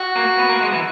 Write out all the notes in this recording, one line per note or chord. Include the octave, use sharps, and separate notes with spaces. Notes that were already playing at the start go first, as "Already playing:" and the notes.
Already playing: F#4
A#3
B3
A#3
G#3
E3